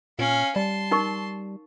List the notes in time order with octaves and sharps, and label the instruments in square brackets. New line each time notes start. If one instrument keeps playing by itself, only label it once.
[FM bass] A#2 [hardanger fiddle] C#4 F5
[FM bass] G3 [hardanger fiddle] A5 C6
[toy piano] D#4 A#4 C#6